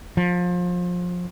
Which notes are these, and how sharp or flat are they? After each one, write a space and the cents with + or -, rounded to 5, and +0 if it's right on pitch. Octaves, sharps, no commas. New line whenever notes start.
F3 +25